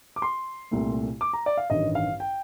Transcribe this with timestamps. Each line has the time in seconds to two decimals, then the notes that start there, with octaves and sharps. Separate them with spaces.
0.16 D6
0.22 C6
0.71 C2 A#2 A3
1.21 D6
1.33 A#5
1.46 D5
1.57 F5
1.70 A1 G2 D#3 G3 D#5
1.95 F5
2.20 G5